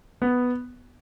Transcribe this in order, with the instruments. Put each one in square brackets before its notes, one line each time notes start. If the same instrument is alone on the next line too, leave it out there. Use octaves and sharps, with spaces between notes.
[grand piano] B3